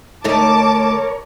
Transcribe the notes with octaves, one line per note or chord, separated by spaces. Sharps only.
D2 A3 D#4 A#4 C#5 A5 D6